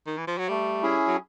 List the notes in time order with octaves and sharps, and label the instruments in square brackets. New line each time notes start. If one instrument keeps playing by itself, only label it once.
[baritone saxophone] D#3
E3
F3
F#3
[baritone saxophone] G3 [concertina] A3
[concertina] C#4 E4 G#4
[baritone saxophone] F#3